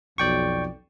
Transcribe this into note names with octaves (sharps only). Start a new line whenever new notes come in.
B1 F2 D5 G5 C#6